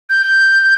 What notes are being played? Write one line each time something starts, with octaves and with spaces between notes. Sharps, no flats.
G6